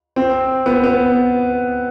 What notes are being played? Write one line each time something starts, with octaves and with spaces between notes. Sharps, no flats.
C4
B3
B3